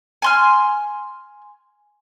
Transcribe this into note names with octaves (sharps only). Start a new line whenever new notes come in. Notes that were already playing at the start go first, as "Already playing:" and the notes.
G#5 C6 F6